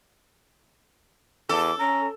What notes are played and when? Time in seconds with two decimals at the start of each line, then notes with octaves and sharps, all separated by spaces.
1.49 E2 A4 D6
1.79 C#4 A#5